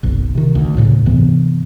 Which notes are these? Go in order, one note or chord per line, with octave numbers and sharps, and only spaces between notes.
F#1 B1
C3 D#3
D2
D2 A2 C#3
G2 C3 E3 B3